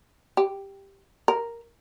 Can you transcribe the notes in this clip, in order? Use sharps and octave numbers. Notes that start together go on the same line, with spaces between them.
G4
A#4